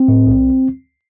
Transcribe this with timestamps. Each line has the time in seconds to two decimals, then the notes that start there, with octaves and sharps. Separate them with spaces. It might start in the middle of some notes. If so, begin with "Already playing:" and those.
Already playing: C4
0.08 A2
0.27 B1